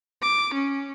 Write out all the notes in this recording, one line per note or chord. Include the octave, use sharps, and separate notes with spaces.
D6
C#4